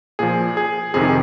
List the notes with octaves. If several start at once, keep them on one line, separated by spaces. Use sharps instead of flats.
A#2 F3 G#4
G#4
F2 C3 D#3 G#4